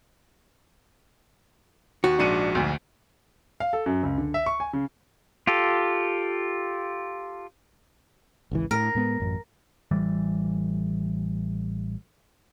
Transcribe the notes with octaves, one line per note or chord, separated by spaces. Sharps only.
D#2 F#4
A#1 G#2 D4 C#7 D#7
D2
F5
A4
F#2
C#2
D3
E5
C#6
G#5
C#3
F4 G4 A4
G#1 C#2 E3
A2 A#4
A2 G#3 B3
A1 F#2
A1 E3 G3